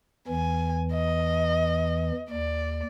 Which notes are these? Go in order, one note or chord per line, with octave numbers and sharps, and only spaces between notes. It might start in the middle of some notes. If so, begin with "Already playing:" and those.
E2 E3 G#5
D#5
D#2 D5